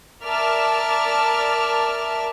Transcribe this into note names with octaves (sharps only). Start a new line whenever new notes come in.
A#4 D5 E5 A5 F6